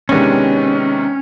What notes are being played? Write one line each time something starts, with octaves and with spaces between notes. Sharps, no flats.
C3 D#3 G#3 B3 C#4 D4